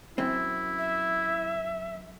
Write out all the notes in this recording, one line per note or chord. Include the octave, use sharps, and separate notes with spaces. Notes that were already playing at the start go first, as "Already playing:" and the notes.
F#2 C4 E4
E5